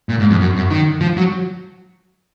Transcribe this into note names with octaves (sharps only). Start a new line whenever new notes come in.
A#2
G#2
F2
F#2
F#2
D#3
F3
F#3